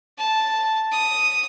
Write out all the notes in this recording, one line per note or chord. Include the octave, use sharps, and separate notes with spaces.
A5
D#6